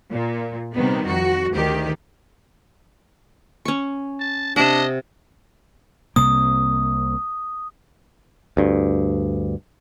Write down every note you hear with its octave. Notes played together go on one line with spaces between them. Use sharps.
A#2
C3 D#3 G3 B3
F2 F#4
D2 D#3 G4
C#4 C#6
A5
C3 D4 D#5 F#5
C2 C3 A#3 D#6
D2 G2